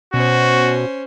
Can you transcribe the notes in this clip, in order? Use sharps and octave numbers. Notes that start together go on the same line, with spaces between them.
B2 C#4 F#4 C5